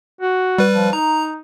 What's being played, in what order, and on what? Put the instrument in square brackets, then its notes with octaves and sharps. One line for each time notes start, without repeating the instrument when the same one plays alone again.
[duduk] F#4
[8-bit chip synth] G3 B4
[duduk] F3
[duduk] D#4 [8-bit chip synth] A#5